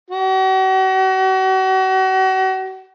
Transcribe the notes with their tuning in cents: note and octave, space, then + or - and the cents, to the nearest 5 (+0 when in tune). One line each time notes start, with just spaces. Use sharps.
F#4 +40